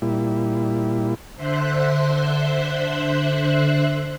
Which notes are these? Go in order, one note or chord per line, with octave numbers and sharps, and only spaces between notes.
A#2 G3 E4
D3 C5 E5 C6 F#6